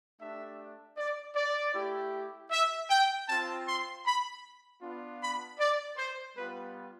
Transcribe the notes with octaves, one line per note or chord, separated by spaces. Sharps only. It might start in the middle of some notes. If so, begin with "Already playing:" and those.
A3 D4 G4 E5
D5
D5
A3 E4 G4
E5
G5
C4 F4 A5
C6
B5
B3 D4 F4
B5
D5
C5
G3 B3 F4 B4